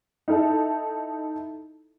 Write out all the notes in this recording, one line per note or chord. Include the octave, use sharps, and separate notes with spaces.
D#4 E4 A4